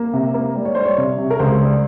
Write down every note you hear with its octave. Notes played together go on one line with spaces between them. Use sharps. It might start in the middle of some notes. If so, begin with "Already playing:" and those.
Already playing: A#3
C3
A#3
G3
C#5
G3 C5
C#5
C3
C3
A#4
C#2 C5
G3